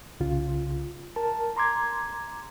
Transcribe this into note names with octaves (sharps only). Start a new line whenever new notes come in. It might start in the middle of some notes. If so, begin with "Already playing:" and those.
C2 C#3 F4
A#4 A5
A#5 C6 D6 G#6